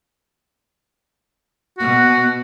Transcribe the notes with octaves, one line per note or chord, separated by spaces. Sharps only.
B2 F#4